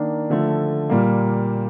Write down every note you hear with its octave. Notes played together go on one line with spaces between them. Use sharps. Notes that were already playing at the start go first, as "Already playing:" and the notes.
Already playing: D#3 A#3 D4
D3 F3 A3
A#2 G3 A#3